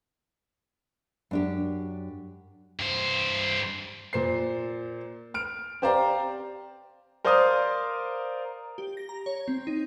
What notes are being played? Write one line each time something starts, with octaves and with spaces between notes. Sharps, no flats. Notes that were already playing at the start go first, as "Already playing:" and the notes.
F#2 D4 G4
G2 C5
A#2 C5 C7
F6 D7
C4 G4 C5 D5 F5 A#5
A#4 C5 D5 F5 A#5 D#6
G4
A#6
A#5
C#5
C4
D#4